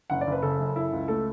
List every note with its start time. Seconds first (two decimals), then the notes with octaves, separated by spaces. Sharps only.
0.10 F#1 F#5
0.21 D5
0.27 F#1
0.32 B4
0.42 C#3 A4
0.59 F#2
0.76 E4
0.93 C#2
1.08 A3 A4